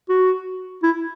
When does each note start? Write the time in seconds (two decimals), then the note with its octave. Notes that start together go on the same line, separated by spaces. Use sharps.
0.09 F#4
0.83 E4